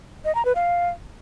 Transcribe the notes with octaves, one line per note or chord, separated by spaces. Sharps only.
D#5
A#5
B4
F5